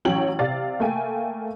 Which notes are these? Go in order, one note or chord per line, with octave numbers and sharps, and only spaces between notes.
A1 F#3 C#4 C#5 G5 F#7
C3 D5 F5 A6
A3 A#3 F5 G5 G#5